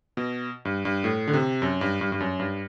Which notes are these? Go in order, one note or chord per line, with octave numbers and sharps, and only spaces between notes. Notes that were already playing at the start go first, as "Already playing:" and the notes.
B2
G2
G2
A2
D3
C3
F#2
G2
G2
G2
F#2
G2